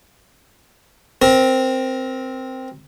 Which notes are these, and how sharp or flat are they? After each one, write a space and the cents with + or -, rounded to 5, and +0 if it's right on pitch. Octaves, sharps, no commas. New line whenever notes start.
C4 +0 A#4 +20